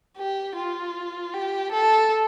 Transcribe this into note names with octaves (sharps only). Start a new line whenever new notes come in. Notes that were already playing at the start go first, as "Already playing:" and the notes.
G4
F4
G4
A4